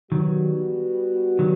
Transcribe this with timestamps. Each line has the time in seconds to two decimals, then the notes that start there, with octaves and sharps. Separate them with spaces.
0.12 D#3 F#3 G3 B3 F#4
1.39 D#3 F#3